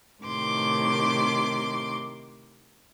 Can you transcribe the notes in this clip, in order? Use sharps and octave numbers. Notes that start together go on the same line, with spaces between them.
A2 C3 D#3 C6 D6